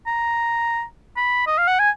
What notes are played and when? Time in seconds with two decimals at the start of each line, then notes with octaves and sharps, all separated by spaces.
0.07 A#5
1.17 B5
1.47 D#5
1.58 F5
1.67 F#5
1.79 G#5